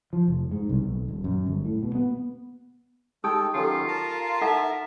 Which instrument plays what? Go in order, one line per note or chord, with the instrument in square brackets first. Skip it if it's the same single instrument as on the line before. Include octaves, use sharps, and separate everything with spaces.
[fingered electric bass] F3
F1
G#2
C2
B1
D#1
F#2
G1
A2
B2
B3
[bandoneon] G#3 A4 [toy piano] D#4 G4 D#6 [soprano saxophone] G5
[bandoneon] D#3 F#3 C#4 [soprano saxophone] F4 [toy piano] G4 A4
[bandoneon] A#4 A5 A#5
[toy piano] D#4 A4 F#5 [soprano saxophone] E5